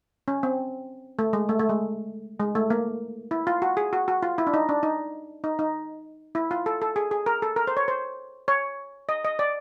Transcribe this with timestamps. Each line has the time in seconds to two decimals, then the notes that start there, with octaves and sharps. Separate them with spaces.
0.28 C#4
0.43 C4
1.19 A3
1.33 G#3
1.49 A3
1.59 A3
1.69 G#3
2.40 G#3
2.55 A3
2.70 A#3
3.31 E4
3.47 F4
3.62 F#4
3.77 G#4
3.93 F#4
4.08 F#4
4.23 F4
4.38 E4
4.47 D4
4.54 D#4
4.69 D4
4.83 D#4
5.44 D#4
5.59 D#4
6.35 E4
6.51 F4
6.66 A4
6.82 A4
6.96 G#4
7.11 G#4
7.26 A#4
7.42 A4
7.56 A#4
7.67 C5
7.77 C#5
7.88 C5
8.48 C#5
9.09 D#5
9.25 D#5
9.39 D5